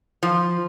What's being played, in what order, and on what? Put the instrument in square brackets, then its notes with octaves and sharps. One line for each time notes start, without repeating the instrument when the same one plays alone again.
[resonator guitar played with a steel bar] F3